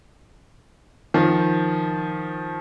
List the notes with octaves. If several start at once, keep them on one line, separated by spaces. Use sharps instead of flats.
D#3 F3